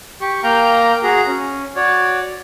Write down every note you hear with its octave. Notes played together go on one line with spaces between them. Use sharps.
G4 C#6
A#3 F5 G5 A#5 G6
F#4 G#4 A#5
C#4
F#4 C#5 D5